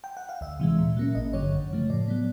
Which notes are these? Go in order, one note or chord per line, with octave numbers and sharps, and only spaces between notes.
G5
F#5
F5
D2 E5
C3 E3 G#3
A#2
F#3 A#3 C#4
G#1 D#5
G2 D3 F#3 C#5
F#2
C#3 F3 A3
A2 D5
F#3 B3